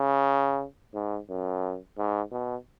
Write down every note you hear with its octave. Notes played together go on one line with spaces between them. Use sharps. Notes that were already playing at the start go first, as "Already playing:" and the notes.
Already playing: C#3
G#2
F#2
G#2
B2